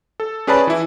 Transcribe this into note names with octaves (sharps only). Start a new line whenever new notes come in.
A4
C#4 G#4 B4 D5 A5 B5
E3 E4